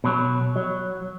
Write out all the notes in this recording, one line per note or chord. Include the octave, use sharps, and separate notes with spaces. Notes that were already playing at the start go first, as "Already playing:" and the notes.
B2 F#3
F#3